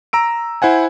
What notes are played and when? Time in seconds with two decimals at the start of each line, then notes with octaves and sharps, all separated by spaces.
0.13 A#5 E6 D7
0.62 E4 C5 F#5 G#5